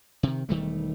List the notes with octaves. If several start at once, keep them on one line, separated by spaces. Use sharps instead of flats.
C3 D#3
E1 D#3 G3 A3